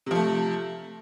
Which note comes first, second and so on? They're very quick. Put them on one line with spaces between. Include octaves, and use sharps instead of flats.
C3 F3 A3